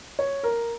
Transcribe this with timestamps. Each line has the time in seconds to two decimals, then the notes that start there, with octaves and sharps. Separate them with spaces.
0.19 C#5
0.43 A#4